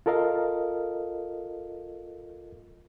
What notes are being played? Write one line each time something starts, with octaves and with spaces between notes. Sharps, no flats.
F4 A4 A#4 D#5 F5